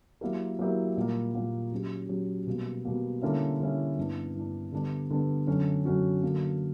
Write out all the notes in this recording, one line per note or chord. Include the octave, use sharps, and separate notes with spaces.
F#3 A#3 E4 G4 A#4
F#3 A#3 E4 G4 A#4
A#2 G3 A#3
A#2 G3 A#3
F#3 C#4 G4
F#3 C#4 G4
B2 G3 A#3
B2 G3 A#3
D3 G3 A#3 C#4 E4
D3 G3 A#3 C#4 E4
G2 E3 B3 D4
G2 E3 B3 D4
D3 G3 B3 D4
D3 G3 B3 D4
F#2 D3 F#3 C#4 F#4
F#2 D3 F#3 C#4 F#4
D3 F#3 A#3